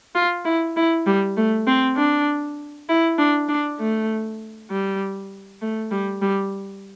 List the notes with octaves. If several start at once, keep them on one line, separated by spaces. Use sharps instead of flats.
F4
E4
E4
G3
A3
C4
D4
E4
D4
D4
A3
G3
A3
G3
G3